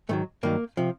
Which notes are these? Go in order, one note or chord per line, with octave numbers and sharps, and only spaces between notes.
G#2 D#3 F#3 A3
G2 D#3 F#3 A#3
C3 F3